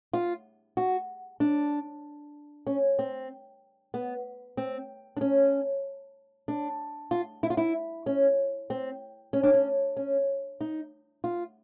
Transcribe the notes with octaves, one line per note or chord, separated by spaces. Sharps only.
F4
F#4
D4
C#4
C4
B3
C4
D4
C#4
D4
F4
E4
F4
E4
C#4
C4
C#4
D4
C#4
C#4
D#4
F4